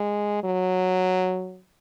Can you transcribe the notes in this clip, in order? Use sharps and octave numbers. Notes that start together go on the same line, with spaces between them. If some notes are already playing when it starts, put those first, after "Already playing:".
Already playing: G#3
F#3